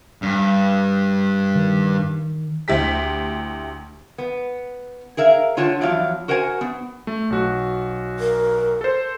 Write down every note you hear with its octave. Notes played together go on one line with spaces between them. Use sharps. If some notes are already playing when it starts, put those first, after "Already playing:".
G2
D#3
D2 E4 G4 B6
B3
G#4 A#4 E5 F5
D3 F4 C#5 F#5 A5
E2 F3 F#3 E4 D5 F5
F#4 A#4 C5 F#5 G#5
B3
A3
B1 F#4
A#4
A4 C5